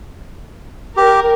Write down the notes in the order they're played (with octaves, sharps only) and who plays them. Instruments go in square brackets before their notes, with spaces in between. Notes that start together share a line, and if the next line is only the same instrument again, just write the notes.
[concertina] G4 [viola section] A#4